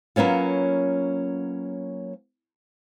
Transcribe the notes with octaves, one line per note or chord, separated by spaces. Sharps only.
F#3 A#3 B3 C#4 F4